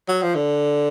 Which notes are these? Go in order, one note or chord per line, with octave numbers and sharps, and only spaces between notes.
F#3
F3
D3